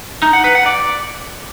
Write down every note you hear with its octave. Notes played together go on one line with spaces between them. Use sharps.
D#4
F#5
B4
F#5
D5